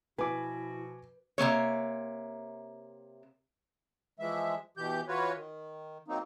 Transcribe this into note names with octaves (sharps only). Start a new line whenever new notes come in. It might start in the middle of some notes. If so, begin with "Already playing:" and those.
B2 F3 E4 F#4 B4 G#5 D6
C3 G#3 A#3 C#5
E3 F3 G#3 E5
B2 E3 G4 G6
E3 F4 F#4 B4 C#5
D#3
F#3 A#3 C4 D#4